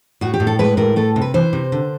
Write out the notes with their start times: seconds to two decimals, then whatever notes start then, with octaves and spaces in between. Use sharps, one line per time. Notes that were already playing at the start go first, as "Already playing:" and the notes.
0.21 A2 F#4
0.34 G4
0.40 A2
0.47 A4
0.59 G#3 B4
0.77 A2 A#4
0.96 A3 A4
1.16 C3
1.22 B4
1.34 E3 C5
1.53 C3
1.72 D3